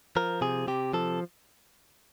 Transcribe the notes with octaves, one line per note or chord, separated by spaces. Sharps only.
F3 A#4
C3 G#4
C3 G4
F3 A4